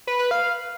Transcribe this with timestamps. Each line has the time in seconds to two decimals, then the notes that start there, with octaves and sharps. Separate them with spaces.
0.07 B4
0.19 B4
0.31 F5